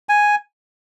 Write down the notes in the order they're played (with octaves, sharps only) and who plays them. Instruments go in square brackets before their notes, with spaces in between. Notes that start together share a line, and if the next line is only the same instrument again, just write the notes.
[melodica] G#5